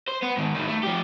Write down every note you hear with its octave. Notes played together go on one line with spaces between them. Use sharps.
C5
B3
G#2 D#3
A2 D#3
A3
F3 G4